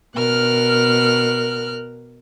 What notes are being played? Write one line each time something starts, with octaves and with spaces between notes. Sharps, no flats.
B2 A#4 F6 F#6